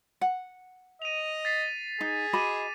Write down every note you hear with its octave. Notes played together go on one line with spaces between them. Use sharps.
F#5
D#5 D#7 F7
A6 B6 C7
D#4 G#4
F#4 D#5 B5 D6 D#7